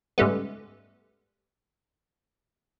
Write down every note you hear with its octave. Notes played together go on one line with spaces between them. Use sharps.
G#2 C#3 G3 A3 B3